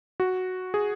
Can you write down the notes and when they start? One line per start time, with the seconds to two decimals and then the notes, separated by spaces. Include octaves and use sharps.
0.20 F#4
0.74 G#4